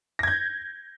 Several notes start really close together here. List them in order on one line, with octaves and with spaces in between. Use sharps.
A#6 G#6 G6